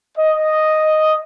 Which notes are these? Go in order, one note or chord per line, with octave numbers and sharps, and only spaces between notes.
D#5